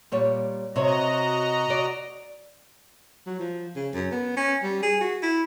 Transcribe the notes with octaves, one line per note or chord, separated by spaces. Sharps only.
A#2 G3 C#5
C3 F#4 C#5 D#5 A#5
D5
F#3
F3
C#3
F#2
B3
C#4
G3
G#4
F#4
E4